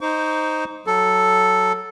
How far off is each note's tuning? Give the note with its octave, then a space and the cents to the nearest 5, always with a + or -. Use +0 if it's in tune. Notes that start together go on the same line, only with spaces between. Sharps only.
D#4 +0 C5 +0 C#6 +45
F#3 +0 A4 +0